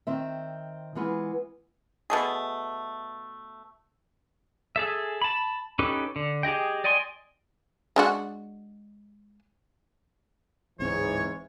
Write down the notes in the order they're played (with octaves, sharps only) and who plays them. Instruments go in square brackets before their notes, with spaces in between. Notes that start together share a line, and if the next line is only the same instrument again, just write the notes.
[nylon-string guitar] D#3 C4 E5
E3 G#3 B3 F4 G#4 B4
[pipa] B2 A3 G#4
[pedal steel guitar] G#4 A4 E5
A5 B5
C#4 D#4 G4 A4 B4
D3
G4 G#4 D#5 G5
D5 D#5 G5 G#5 C6
[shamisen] G#3 D4 F#4
[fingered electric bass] D1 C4 [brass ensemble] G#2 E3 [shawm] C#5